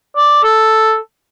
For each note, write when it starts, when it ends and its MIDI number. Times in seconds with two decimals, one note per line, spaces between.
0.16 0.42 74
0.43 0.97 69